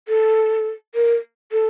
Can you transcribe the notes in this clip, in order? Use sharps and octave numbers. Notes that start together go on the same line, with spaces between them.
A4
A#4
A4